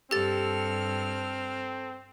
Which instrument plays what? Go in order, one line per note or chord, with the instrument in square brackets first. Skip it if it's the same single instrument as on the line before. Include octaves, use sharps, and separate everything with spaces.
[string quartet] G2 F6 [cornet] C4 [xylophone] G4 A6 [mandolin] A4